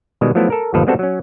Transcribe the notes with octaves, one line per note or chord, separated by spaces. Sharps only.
B2 D#3 G3 G#3
F3 F#3 A3 B3 E4
A4 A#4
G1 D#2 F3 A4 B4 F5
G3 G#3 B3 C4 F#4 A4
F#3 C#4